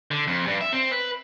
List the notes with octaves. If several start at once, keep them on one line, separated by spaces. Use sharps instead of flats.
D3
F2
G2
E5
C4
B4